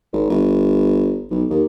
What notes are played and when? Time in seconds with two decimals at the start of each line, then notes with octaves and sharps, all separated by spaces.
0.13 G#1
0.30 G1
1.31 B1
1.50 D#2